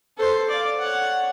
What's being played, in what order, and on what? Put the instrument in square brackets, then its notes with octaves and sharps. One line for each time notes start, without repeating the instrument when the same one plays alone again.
[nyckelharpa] A4 C5
D5 F5
C#5 F#5